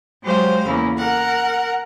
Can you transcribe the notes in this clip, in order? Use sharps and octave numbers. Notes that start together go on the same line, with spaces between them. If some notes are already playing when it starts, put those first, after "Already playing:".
F#3 G#3 G4 C5 F5
E2 C#3 A#3 E4
A#4 F#5